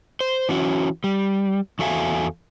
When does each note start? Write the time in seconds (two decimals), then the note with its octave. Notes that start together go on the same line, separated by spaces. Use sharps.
0.21 C5
0.49 E3 C#4 F#4
1.04 G3
1.79 E2 F#4 A4 E5 F5 G#5